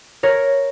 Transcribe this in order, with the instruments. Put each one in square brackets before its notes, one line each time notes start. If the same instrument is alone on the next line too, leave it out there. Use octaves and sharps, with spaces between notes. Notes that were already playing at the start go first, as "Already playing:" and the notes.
[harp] A#4 C#5